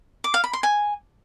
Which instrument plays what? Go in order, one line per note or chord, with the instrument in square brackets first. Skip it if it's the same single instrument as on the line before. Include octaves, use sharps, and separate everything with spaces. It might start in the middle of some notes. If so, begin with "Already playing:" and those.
[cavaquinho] D6
F5
B5
C6
G#5